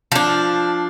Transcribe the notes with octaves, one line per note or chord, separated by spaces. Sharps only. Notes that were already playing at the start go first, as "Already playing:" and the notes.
F3 D4